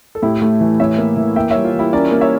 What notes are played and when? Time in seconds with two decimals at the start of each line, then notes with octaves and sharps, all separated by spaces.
0.15 A4
0.22 A2 E4 G4
0.42 A3
0.61 E3
0.80 A2 C#5 E5
0.98 A#3
1.17 E3
1.36 A#3 E5 G5
1.51 G3 C#5 E5
1.65 F4
1.75 E3 E4 G4
1.93 C#4 A#4 D5
2.11 A#3
2.21 C#5 E5